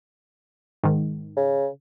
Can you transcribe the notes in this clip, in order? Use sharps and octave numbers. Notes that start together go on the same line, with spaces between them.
G#2 D#3
C#3